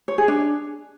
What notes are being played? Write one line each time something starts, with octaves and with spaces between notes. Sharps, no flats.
C#5
G#4
D4